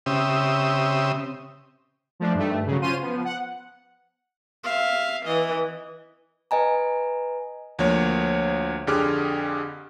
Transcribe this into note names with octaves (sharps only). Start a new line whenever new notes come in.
C#3 C4 G4 E5 D#6
F3 A3 D4
G2 D#3 A3
C#3 F#3
C#4 F4 C5 C6 D#7
F3 B3
F#5
E5 F5
E3 D#5
B4 D#5 G#5 A#5
D2 F3 A#3 C#5
F2 D3 G4 G#4 D6 F6